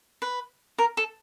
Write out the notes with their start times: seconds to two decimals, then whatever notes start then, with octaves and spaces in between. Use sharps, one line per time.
0.22 B4
0.78 A#4
0.97 A4